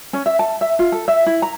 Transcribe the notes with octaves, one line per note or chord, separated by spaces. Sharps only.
C#4
E5
A5
E5
F4
A4
E5
E4
A#5